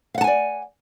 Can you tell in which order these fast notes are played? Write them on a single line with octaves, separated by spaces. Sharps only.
F5 F#5 A5 G#5 D5